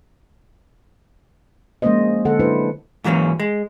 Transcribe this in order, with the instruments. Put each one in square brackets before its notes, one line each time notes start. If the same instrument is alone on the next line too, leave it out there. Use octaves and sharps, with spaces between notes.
[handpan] F3 G#3 A#3 C#4 C5 D#5
D3 A4 F#5
F#3 D4 E4 B4 C5
[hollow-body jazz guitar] G#2 E3 F#3 A#3 C#4
G#3